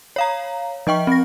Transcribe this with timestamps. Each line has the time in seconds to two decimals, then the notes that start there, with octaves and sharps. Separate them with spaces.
0.16 C#5 F5 A#5
0.87 F3 D#5 G5 C#6
1.07 C4 A#6